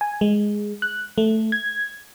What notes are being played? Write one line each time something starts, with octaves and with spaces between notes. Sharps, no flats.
G#5
G#3
F#6
A3
G#6